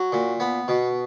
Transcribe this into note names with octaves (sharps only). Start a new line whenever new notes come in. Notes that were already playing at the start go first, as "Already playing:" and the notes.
Already playing: F#3
A#2
B3
B2